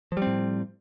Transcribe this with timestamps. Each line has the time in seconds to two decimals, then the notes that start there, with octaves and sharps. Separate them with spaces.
0.12 F3
0.17 G3
0.22 C4
0.27 A2